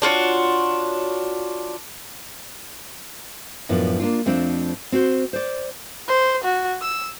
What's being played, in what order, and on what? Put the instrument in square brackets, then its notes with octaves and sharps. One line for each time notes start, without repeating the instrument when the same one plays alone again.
[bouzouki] D4 F4 F#4 C#5
[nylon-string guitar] F#2 A2 F3 B3 D4
A#3 D4 F4
F2 F3 A3 C4 D4
C4 F#4 C5
C5 D5
[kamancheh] C5
F#4
E6